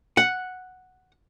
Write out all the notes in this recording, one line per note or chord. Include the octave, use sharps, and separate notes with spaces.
F#5